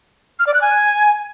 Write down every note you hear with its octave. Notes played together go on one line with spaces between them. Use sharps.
F6
D5
F#6
G#5